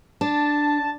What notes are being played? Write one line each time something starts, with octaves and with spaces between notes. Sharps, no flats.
D4 A5